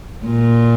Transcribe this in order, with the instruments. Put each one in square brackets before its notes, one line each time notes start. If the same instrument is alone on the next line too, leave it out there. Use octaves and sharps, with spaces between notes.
[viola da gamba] A#2